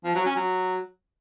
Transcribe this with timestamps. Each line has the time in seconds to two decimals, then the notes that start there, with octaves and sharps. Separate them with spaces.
0.04 F3
0.15 F#3
0.25 C#4
0.36 F#3